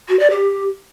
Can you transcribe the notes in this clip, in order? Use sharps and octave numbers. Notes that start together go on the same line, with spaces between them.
F#4
D5
G4